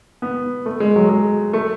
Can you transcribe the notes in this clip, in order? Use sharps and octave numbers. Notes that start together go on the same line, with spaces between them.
B3
A3
G#3
F#3
G#3
A3